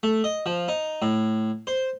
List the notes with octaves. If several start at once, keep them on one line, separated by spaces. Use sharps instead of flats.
A3
D#5
F3
D#4
A2
C5